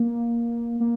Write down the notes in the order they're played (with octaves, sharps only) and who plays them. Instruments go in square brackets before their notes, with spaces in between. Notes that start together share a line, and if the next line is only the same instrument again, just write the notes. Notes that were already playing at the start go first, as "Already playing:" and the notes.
Already playing: [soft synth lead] A#3
A#3